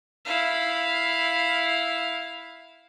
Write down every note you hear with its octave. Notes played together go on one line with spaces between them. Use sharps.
E4 F5